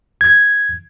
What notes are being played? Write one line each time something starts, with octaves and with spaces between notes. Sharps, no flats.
G#6